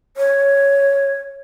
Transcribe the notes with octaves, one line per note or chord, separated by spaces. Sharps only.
C#5